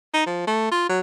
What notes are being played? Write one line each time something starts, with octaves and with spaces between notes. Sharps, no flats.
D#4
F3
A3
F4
F#3